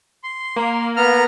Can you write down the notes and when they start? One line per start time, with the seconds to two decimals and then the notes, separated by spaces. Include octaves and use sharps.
0.23 C6
0.56 A#3
0.96 B3 A#5 F6